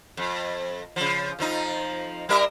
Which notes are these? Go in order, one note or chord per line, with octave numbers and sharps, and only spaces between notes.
F2
C#3 F3
F2 F3 D#4
G3 A#4 E5